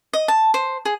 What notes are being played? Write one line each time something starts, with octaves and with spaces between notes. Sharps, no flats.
D#5
A5
C5
G#4